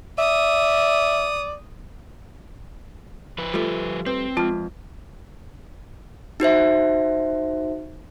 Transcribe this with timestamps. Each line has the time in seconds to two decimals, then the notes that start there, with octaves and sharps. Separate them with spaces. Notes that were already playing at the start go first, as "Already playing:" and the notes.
0.19 D5 E5 D#6
3.38 F3 B4
3.54 G3 A3 F4
4.07 C4 B4
4.37 F2 G#3 F4 A5
6.40 D#4 F#4 C5 E5